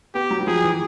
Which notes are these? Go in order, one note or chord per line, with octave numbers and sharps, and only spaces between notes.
B3 G4
F#3
F#3
F3 G#4
E3